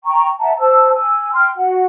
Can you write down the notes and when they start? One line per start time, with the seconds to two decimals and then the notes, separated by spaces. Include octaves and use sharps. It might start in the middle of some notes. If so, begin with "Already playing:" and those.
0.04 G5 A#5 C#6
0.40 E5 F#5 A5 A#5
0.59 C5 A5 E6
0.94 G#5 E6
1.33 G5 C6 F6
1.56 F#4 F#5